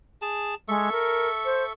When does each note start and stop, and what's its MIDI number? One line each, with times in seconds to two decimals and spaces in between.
0.22 0.55 68
0.22 0.55 81
0.68 0.89 56
0.68 1.73 69
0.68 1.73 76
0.68 1.73 85
0.92 1.28 70
1.45 1.64 72